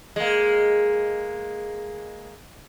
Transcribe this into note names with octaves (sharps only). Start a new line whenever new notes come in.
G#3 A#3